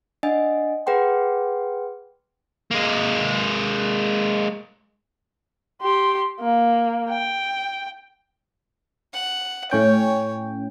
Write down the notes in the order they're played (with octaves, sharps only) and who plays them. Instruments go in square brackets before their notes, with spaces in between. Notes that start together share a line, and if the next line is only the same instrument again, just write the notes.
[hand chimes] D4 D#5 F#5 G#5
G#4 B4 F#5 G5 C6
[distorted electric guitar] G#3 A#3
[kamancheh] G4 C6
A#3
G5
[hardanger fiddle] F#5
[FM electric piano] A2 C#4 G5 [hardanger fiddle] C#5